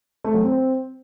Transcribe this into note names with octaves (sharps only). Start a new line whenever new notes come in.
A3
F#3
C4